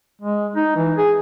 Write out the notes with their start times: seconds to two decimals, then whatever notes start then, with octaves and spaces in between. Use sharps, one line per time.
0.22 G#3
0.56 D#4
0.77 E3
0.97 G#4